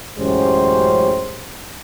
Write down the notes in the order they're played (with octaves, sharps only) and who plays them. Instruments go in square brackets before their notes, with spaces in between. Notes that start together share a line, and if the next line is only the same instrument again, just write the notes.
[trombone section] A1 F#2 G#3 C#4 G4 C5